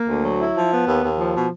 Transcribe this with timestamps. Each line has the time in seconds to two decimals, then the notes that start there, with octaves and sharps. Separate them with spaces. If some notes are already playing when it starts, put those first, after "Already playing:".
Already playing: A#3
0.09 D2
0.24 F#3
0.40 E4
0.56 F3
0.72 B3
0.87 D#2
1.03 D#2
1.18 F3
1.35 B2